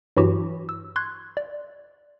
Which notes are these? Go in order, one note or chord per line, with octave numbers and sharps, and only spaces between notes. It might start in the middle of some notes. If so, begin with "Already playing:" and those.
G2 E3 F#3 E4 F#4 G4
E6
C6 C#6 F#6 G#6
D5